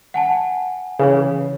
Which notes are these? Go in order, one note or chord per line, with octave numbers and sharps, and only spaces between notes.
F#5 G#5 A5
C#3 E3 B4 C#5